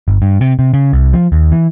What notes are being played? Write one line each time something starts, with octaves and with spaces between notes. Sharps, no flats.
G1
G2
C3
C3
C#3
C2
F3
D#2
E3